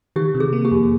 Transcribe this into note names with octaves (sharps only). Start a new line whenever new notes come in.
D#3 G4
C3
G#4
A#3
G4
F2